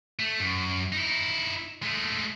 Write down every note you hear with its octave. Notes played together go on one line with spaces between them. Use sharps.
A3
F#2
D#4 E4
G#3 A3